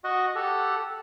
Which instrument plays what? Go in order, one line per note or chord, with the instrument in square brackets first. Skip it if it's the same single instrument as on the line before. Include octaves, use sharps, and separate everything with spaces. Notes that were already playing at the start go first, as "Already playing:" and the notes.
[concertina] F#4 D#5 F#5
G4 A4 F#5